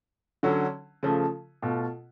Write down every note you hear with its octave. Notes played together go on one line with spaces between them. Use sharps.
D3 F#3 C#4
C#3 F3 A3
B2 A3 F4